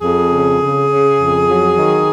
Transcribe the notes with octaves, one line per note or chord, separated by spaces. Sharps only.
F2 G#4
C#3
C#3
C#3
F2
F#3
D#3